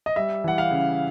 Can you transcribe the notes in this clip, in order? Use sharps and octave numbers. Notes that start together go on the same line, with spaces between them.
D#5
G3 E5
E3 F#5
F5
C#3